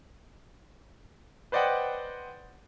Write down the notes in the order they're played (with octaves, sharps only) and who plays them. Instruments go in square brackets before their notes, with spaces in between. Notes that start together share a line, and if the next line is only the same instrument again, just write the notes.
[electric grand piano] B4 C5 D5 D#5 F#5 G5